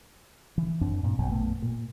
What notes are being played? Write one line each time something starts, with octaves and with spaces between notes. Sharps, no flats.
E3
F#2 C4 D4
G2 A#2
A#1 F#2 B2
A#1 F#2 A3 B3
A#2